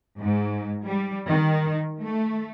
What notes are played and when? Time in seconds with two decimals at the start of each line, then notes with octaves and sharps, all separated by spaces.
0.19 G#2
0.84 G3
1.29 D#3
2.02 A3